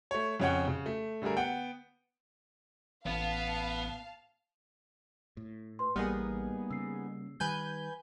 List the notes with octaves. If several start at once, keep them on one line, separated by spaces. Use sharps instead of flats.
A3 C#5
F2 C#3 C#4 C#5 F#5 G5
C#3
A3
D3 G3 A3 G#4 A#4
B3 F#5 G5
A1 B3 F5 A5
A2
B4 C6
A1 G3 A#3 B3 D#4 G#4 F6
C#3 E6 C7
D#3 G3 B4 G#5 G6